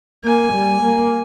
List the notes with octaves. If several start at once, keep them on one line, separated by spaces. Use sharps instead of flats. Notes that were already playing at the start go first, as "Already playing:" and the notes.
A#3 G#5
G3
A#3